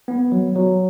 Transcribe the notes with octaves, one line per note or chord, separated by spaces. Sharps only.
B3
F#3
F#3